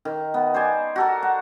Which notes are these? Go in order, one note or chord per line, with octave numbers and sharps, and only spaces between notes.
D#3
B3
C5 D5 G#5
F#4 A4 A#4
F#5